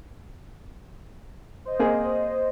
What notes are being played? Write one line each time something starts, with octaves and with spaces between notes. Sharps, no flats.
C5 D#5
A#3 C4 G#4